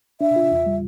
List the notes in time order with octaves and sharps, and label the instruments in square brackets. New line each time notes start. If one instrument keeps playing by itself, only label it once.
[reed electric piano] D4 [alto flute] E5
[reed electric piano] F4
E2
G3